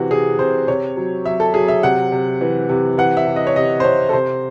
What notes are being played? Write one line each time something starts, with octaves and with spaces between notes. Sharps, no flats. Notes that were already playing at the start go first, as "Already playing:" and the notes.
Already playing: C3 E3 F#4
C3 G#4
C3 C5
C3 C#5
F#3
F#3 E5
A4
F#3 G#4
E5
C3 F#5
C3
E3
C3
E3 F#5
E5
C3
D#5
C#5
C3 D#5
C5
C3 C#5
A4
C3 C5